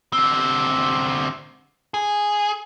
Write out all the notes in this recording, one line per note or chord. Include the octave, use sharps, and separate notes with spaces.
D3 C4
G#4